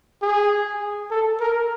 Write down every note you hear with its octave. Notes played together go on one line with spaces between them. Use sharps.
G#4
A4
A#4